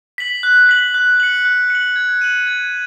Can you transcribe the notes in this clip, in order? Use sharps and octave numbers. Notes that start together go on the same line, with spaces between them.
B6 F#7
F#6
B6 F#7
F#6
C#7 F#7
F#6
C#7 F#7
G#6
D#7 F#7
G#6